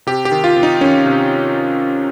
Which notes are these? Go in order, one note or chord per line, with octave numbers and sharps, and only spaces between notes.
C3 G4
G4
D#3
F4
C3
D#4
D#3 C#4
C3